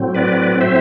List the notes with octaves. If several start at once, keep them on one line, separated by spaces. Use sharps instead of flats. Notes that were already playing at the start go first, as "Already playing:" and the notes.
Already playing: A2 F#3 C4
B4 D5
C5 E5